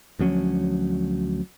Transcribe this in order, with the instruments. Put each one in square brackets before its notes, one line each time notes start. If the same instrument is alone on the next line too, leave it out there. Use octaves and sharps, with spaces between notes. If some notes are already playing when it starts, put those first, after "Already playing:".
[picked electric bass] D2 F3 F#3 C#4